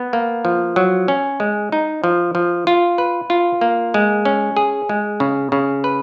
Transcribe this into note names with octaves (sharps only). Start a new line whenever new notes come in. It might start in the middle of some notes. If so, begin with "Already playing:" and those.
Already playing: B3
A#3
F3
F#3
C#4
G#3
D#4
F3
F3
F4
B4
F4
A#3
G#3
C#4
G#4
G#3
C#3
C#3
B4